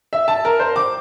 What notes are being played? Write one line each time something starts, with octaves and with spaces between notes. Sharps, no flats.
E5
A5
A#4
C5
D6